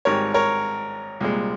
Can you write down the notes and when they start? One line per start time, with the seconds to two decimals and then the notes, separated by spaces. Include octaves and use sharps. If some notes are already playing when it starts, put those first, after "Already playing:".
0.05 G#1 G#2 G3 A#4 C#5
0.34 A#4 C#5
1.21 C2 A#2 G#3